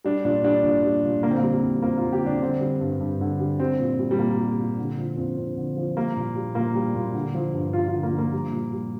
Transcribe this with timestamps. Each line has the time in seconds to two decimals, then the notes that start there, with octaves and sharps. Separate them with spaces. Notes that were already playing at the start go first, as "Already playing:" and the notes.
0.05 G3 D4
0.25 A#2 D4
0.44 G3 D4
0.64 A#2
0.84 G3
1.04 A#2
1.23 D3 A#3
1.31 C4
1.38 A#3
1.43 G3
1.53 G3
1.63 F2
1.82 F2 A#3
1.97 D3 F4
2.13 G4
2.22 G3 D4
2.42 D3 C4
2.61 G3
2.81 G2
3.00 G2
3.21 D3
3.40 G3
3.59 G3 C4
3.80 A#2
3.99 G3
4.11 G3
4.19 A#2 A#3
4.39 G3
4.58 A#2
4.79 D3
4.98 F3
5.17 F2
5.37 F2
5.57 D3
5.77 F3
5.97 G3 A#3
6.16 A#2
6.36 G3
6.55 A#2 A#3
6.75 G3
6.95 A#2
7.14 D3
7.35 F3
7.54 G2
7.73 G2 F4
7.88 F4
7.93 D3
8.03 A#3
8.13 F3
8.18 A#3
8.33 G3
8.53 A#2
8.73 G3